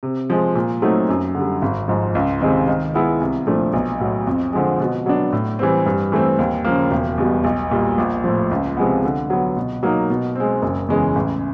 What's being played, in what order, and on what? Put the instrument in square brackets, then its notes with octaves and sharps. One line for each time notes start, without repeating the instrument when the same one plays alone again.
[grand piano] C3
F3 G#3
A#2
F#3 A3 C4 D#4
F#2
D3 G3
G#1
G#2 F3
C#2
C3 D#3 G#3 C4
D#3
G#3 B3 E4
C2
A#2 F3 A3 D4
B1
A2 F#3
F2
D3 F3 G#3
B2
F#3 B3 D4
A2
E3 G3 C4
G2
E3 A3 C4
D#2
C#3 F3 A#3
E1
E2 B2 G3
B1
A#2 G3
A#1
A2 F3
C#2
C3 F3 G#3 B3
D3
F#3 B3
B2
F#3 A#3 D#4
B2
G#3 C4
F#1
E2 C#3 E3 G#3
A1